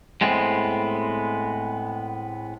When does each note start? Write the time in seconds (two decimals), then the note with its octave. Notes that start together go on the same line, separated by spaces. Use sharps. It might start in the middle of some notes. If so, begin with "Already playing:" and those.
0.21 A2 G#3 B3 C4